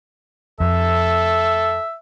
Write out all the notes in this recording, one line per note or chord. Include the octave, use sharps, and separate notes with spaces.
F2 A4 E5